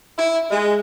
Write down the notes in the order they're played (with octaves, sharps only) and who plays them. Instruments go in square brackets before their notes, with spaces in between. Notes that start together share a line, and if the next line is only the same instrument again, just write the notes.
[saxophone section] E4
G#3